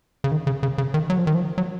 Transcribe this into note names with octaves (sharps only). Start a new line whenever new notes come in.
C#3
D#3
C#3
C#3
C#3
D#3
F#3
F3
D#3
F3
F#3